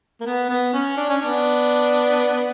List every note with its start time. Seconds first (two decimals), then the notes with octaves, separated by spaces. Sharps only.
0.21 A#3
0.26 B3
0.50 B3
0.73 C#4
0.97 D4
1.10 C#4
1.22 B3 D4